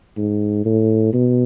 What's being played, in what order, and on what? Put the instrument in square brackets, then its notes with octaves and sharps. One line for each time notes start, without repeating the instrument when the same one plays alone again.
[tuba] G#2
A2
B2